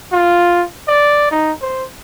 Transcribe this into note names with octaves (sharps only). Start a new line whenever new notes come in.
F4
D5
D#4
C5